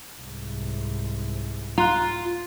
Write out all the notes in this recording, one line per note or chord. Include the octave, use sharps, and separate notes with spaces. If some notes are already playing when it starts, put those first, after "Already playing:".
C2 G#2
F4 A#5 C6 F#6